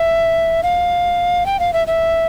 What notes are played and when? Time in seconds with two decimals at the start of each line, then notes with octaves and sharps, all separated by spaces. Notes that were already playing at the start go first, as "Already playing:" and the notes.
Already playing: E5
0.63 F5
1.46 G5
1.60 F5
1.73 E5
1.87 E5